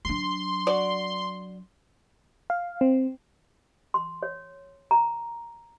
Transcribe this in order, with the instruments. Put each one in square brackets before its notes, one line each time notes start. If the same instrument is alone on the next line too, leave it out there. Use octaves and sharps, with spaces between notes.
[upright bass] F#3 D4 [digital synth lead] C6
[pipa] F#4 D5
[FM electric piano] F5
C4
[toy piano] C6
C#5
A#5